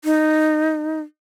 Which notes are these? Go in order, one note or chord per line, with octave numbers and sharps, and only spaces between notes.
D#4